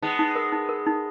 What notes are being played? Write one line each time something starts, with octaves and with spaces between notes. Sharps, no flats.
G#3 B3 D#4
D#4
A#4
D#4
A#4
D#4